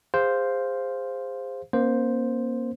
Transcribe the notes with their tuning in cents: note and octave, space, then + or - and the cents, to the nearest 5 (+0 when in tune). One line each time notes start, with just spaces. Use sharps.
G#4 -35 C5 +0 F5 +0
A#3 +25 C#4 -25 C5 +0